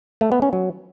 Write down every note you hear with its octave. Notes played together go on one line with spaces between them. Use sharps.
A3
B3
C#4
F#3